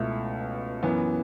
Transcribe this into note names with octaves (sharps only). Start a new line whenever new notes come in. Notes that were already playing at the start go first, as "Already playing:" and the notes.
Already playing: C#2 B2 A3 E4
F#2 E3 B3